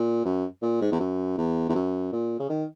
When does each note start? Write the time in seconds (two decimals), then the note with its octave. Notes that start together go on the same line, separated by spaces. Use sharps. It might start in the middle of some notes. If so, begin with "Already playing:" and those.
Already playing: A#2
0.25 F#2
0.62 A#2
0.81 G#2
0.92 E2
1.00 F#2
1.37 E2
1.69 E2
1.75 F#2
2.12 A#2
2.39 C#3
2.49 D#3